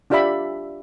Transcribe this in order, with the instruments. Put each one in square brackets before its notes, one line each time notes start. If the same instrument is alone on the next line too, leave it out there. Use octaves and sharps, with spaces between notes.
[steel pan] D4 F4 G4 D5 E5 B5